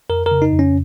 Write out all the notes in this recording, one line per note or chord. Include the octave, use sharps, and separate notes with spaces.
F2 A#4
A#4
C#3
D#4
F2
C#4